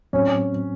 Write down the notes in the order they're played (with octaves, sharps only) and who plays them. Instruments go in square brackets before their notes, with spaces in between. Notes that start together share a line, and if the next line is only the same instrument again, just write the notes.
[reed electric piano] A2 F#3 C4 [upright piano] C#4